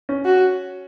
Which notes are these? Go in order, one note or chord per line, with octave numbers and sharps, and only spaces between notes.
C#4
F#4